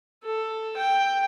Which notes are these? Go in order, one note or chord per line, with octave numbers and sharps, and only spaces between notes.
A4
G5